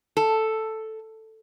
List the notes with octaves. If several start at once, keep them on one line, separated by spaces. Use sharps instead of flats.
A4